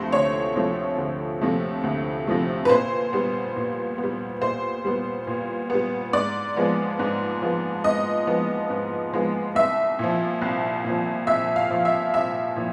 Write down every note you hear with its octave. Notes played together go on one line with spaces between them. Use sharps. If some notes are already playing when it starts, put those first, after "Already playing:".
Already playing: D2 C3 F3 A3 C5
D2 C#5
C3 F3 A3
D2
C3 F3 A3
D2
C3 F3 A3
B4
A#2 C5
G3 B3
A#2
B3
G3
A#2 C5
G3 B3
A#2
G3 B3
G#2 D5
F3 G#3 B3
G#2
F3 G#3 B3
G#2 D#5
F3 G#3 B3
G#2
F3 G#3 B3
C2 E5
A#2 F3
C2
A#2 F3
C2 E5
F5
A#2 F3
E5
C2 E5
A#2 F3